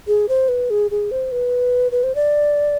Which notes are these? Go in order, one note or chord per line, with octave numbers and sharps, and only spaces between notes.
G#4
C5
B4
G#4
G#4
C5
B4
B4
C5
D5